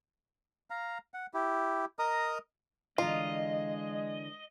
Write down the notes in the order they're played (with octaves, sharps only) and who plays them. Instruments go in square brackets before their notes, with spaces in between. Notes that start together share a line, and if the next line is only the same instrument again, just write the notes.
[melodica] F5 A#5
F#5
E4 G4
A#4 D#5 A#5 D#6
[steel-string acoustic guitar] D3 E3 A#5 [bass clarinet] G#3 [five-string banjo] F4 [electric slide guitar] D#5